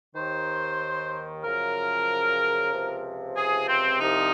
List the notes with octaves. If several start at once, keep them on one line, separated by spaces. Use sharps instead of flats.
D#2 D#3 C5
F#2 C#3 F3 A#4
C#2 C3 F3
G#4
C4
C2 C3 F3 D#4